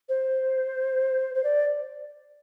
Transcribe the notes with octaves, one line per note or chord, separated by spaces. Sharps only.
C5
C5
D5